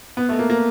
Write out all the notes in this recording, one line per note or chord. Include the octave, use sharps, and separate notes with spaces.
B3
A3
A#3
A#3